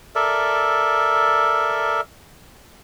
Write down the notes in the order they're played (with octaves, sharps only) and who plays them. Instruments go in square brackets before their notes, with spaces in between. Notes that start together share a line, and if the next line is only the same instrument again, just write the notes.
[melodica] A4 A#4 D5 E5